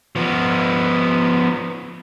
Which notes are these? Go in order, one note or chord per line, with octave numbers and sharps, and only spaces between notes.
F3 B3